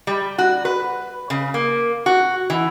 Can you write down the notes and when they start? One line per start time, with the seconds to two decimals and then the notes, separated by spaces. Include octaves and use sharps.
0.07 G3
0.38 F#4
0.65 B4
1.30 C#3
1.54 A#3
2.06 F#4
2.50 E3